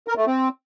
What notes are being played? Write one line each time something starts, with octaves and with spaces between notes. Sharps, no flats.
A#4
A3
C4